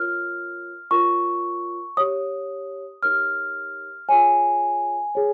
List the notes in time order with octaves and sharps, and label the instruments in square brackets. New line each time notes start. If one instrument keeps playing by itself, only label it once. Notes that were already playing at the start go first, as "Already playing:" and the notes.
Already playing: [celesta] F4 A#4 C#5 F6
F4 A#4 C#5 C#6
G4 C#5 D#6
D#4 G4 A#4 C#5 F6
F4 G#4 C#5 G#5
G#4 C#5